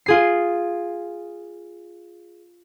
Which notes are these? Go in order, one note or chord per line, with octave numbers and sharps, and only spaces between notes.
F4 G#4 C7